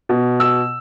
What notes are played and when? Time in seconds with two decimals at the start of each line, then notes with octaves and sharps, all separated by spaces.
0.09 B2
0.40 E6